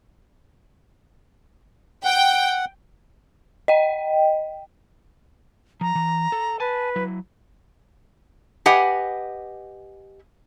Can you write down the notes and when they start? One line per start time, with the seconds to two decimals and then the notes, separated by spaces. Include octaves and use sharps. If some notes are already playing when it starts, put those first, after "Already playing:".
2.05 F#5 G5
3.68 D#5 G5
5.81 F3 A#5
5.95 E3
6.32 A4
6.60 B4 G#5 A5
6.96 F#3 E4
8.66 G4 B4 D#5 F#5 G#5